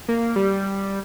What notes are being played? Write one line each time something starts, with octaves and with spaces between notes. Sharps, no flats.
A#3
G3